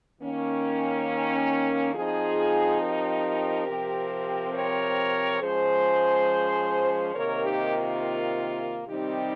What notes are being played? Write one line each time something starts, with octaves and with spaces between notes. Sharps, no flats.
D#3 A#3 C#4
F3 C4 D#4 F4 G#4
G4 A#4
C3 F3 C4
A#4 C#5
F3 G#3 C#4 G#4 C5
C3 D#3 A#3 A#4 C#5
D#4 G4
F4
C3 D#3 G3 C4 D#4 G4